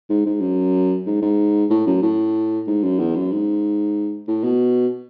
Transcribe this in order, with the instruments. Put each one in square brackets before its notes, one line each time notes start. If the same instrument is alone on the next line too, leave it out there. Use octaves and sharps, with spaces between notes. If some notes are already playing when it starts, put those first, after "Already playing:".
[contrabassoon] G#2
G#2
F#2
G#2
G#2
A2
F#2
A2
G#2
F#2
E2
F#2
G#2
A2
B2